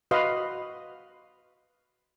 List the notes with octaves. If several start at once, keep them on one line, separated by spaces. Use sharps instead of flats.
F#4 B4 D#5 F5 B5 C6